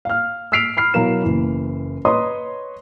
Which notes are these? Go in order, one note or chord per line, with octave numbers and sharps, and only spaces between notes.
F5 F6
E6 F6 B6 C7 D7 F7
B5 F6 C7
B2 F#3 E4 A#4 F5 E7
F#1 E3
B4 C#5 D#5 A#5 C6 D#6